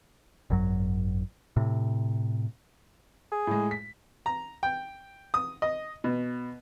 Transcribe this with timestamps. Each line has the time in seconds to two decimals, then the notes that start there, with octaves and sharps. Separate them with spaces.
0.50 G#1 F#2 F#3
1.57 A2 C3
3.32 G#4
3.47 A2 G#3
3.71 B6
4.26 A#5
4.63 G5
5.34 D#6
5.62 D#5
6.04 B2